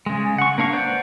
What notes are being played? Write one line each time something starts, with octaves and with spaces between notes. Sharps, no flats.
C#3 G#3
F#5 C#6
A#3 D4 F5 C#6
B4 C5 D5 F#5